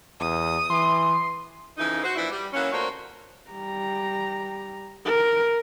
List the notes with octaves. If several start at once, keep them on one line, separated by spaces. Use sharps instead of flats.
E2 D#6
E3 C6
F2 C#3 E3 D#4
F#4 C5
A#2 E3 F3 D4 E4
G3
E3 F#3 A#3 C#4
D2 A#3 D4 F4 C5 C#5
G3 A#5
A#4